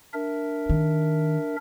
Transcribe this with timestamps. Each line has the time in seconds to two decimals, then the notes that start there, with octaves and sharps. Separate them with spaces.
0.14 D4 A#4 E5
0.69 D#3